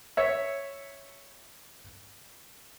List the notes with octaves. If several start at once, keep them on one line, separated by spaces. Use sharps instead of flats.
C#5 E5